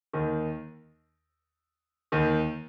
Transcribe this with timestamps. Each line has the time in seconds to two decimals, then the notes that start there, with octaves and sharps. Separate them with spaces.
0.13 D#2 D#3
2.12 D#2 D#3